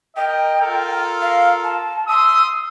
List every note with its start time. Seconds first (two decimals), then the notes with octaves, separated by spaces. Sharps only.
0.16 A#4 D#5 G5
0.61 F4 A4 A#4
1.22 F5
1.63 A5
2.08 C6 D#6 E6